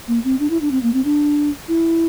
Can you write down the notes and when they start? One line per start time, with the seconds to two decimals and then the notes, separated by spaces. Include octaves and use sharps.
0.08 A#3
0.24 C4
0.40 D4
0.50 E4
0.61 D4
0.71 C4
0.83 A#3
0.94 C4
1.05 D4
1.68 E4